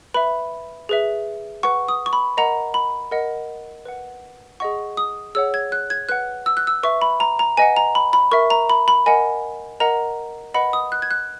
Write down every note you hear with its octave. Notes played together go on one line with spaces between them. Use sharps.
B4 E5 B5
G#4 B4 E5
B4 F#5 C#6
D#6
C#6
B5
A#4 D#5 F#5 A#5
B5
A#4 D#5 F#5
B4 F#5
G#4 D#5 F#5 C#6
D#6
G#4 C#5 F#5 E6
G#6
F#6
G#6
B4 F#5 F#6
E6
F#6
E6
B4 E5 C#6
B5
A#5
A#5
B4 D#5 F#5 G#5
A#5
B5
B5
A#4 E5 C#6
A#5
B5
B5
A#4 D#5 F#5 G#5
A#4 D#5 F#5 A#5
B4 D#5 F#5 B5
D#6
F#6
G#6
F#6